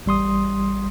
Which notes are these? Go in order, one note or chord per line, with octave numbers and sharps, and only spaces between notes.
A1 G3 C6 D#6